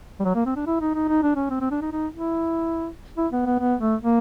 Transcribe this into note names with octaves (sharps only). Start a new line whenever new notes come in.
G3
F#3
A#3
C4
D4
E4
D#4
D#4
D#4
D4
C#4
C4
C4
D4
D#4
D#4
E4
E4
B3
B3
B3
A3
A#3